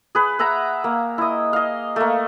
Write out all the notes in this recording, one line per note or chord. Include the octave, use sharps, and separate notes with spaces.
G#4 B4
B4 E5 F#5 A#5
A#3
E4 D#5
D#5 F5
A3 A#3